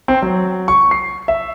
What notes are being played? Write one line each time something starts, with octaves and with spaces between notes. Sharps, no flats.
C4
F#3
C#6
C7
E5